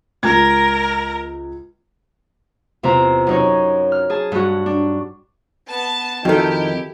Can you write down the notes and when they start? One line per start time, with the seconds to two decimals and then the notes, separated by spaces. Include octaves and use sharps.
0.23 C#2 A#4 G#6
2.83 E2 C3 C4 F4 A#5
3.27 F#2 D#4 C#5
3.92 F6
4.10 G#4 A5
4.32 G2 F#4
4.66 D4
5.68 B3 A5
6.25 F2 D#3 D#4 E4 F#4 G4 A4